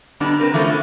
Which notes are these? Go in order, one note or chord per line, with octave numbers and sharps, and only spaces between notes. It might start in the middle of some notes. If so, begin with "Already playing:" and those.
D3 G3 B3 D4 D#4
C4 A#4 B4
E3 F3 A3 B3 C#4 C5
D3